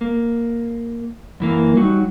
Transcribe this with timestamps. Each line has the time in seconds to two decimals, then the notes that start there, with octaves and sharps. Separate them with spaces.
0.01 A#3
1.40 F#2 E3 A#3
1.77 F#3 G3 D#4 F#4